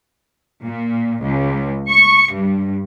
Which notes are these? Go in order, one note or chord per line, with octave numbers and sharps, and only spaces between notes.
A#2
C#2
C#6
G2